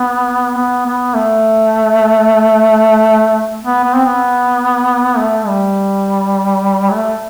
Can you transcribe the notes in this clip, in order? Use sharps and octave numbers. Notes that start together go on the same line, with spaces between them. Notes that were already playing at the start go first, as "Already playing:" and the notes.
Already playing: B3
B3
B3
A3
B3
B3
C4
B3
A3
G3
A3